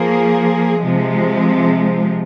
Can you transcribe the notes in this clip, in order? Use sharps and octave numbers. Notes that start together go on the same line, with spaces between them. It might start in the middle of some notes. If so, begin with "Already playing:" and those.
Already playing: F3 A#3 G#4
C3 F3 G#3